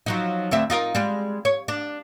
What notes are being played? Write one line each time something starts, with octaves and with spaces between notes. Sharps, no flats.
F3 F#3 D#4
D2 C4 E5
D#4 F4 A#4
G3 G#3
C#5
D4